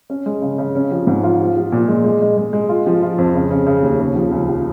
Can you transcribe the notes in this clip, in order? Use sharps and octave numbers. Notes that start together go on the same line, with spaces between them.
C#4
G#3
C#3
C#3
C#4
F3
G#2
F4
F3
F3
A#2
G#3
G#3
G#3
G#3
G#3
F4
F3
F4
F2
C#3
C#3
C#3
D#2
C#3
F3
C#2
F3